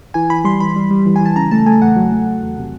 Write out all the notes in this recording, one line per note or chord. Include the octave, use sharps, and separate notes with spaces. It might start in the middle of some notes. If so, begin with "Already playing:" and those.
E3 G#5
E3 B5
G3 C6
E3 B5
G3
G3
E3
G#5
E3 A5
C#3 A#5
A3 A5
A3 G#5
E2 F#5
F#3
A3
F#3
E2
C3